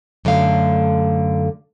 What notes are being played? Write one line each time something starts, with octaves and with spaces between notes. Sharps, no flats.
F#2 D3 A3 F5